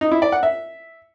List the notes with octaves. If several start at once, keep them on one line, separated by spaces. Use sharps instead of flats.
D#4
E4
D5
F#5
E5